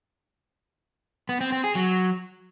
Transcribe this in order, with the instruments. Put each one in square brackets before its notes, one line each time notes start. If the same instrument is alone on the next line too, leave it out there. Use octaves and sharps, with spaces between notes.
[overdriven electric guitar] B3
C4
C4
G#4
F#3